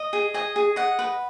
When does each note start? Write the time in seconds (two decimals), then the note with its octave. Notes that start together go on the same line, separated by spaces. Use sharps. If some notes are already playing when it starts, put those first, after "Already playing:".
Already playing: D#5
0.13 G#4
0.34 D#5 G#5
0.56 G#4
0.76 D#5 F#5
0.99 B4